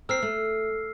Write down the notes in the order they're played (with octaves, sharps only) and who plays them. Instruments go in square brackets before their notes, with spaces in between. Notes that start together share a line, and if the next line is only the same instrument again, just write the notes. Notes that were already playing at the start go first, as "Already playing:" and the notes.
[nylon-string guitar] C4 A#4 [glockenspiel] E6 F6 C7
[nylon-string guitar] A3